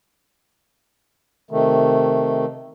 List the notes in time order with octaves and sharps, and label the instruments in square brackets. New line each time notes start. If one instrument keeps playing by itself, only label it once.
[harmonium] C3 D#3 A3